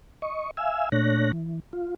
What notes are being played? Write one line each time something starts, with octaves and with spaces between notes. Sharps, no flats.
D#5 C#6
E5 F5 G#5 E6
A#2 A3 D4 C#5 F#6 A#6
E3
F4